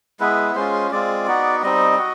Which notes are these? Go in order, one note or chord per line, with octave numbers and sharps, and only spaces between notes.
G#3 B3 E4 B4
G#3 C#4 F4 C5
G#3 C4 F4 D5
B3 D#4 F#4
G3 C4 D#4 D#5
F#4